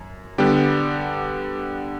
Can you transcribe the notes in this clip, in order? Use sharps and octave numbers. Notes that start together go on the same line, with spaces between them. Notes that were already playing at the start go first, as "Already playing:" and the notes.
Already playing: F#2
D3 G3 B3 D4 G4